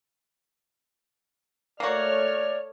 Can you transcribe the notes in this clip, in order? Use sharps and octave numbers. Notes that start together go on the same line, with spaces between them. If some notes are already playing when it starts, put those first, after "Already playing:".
A3 A#3 F#4 C#5 D5 F6